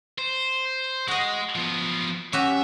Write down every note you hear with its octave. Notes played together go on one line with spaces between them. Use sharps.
C5
G#3 F#4 D#5
F3 B3
C#4 F#4 G4 E5